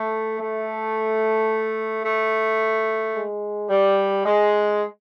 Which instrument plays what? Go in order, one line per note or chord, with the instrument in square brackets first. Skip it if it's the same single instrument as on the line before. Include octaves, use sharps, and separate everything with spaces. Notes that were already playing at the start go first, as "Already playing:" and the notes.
Already playing: [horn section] A3
A3
A3
G#3
G3
G#3